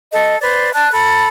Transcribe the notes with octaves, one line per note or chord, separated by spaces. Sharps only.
A4 D#5
B4 C5 D5
D5 A5 F#6
A4 B5